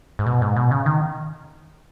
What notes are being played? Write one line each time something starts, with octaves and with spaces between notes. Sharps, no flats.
G#2
B2
G#2
B2
C#3
D#3